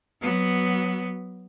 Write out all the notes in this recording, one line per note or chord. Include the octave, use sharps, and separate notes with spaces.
F#3 B3